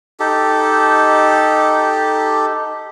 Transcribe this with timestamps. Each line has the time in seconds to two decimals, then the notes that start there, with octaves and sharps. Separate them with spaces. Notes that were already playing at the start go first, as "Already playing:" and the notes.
0.20 D#4 G4 A4